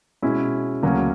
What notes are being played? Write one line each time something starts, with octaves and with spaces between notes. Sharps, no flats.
B2 G#3 C#4 E4
D2 C#3 F#3 A#3 C#4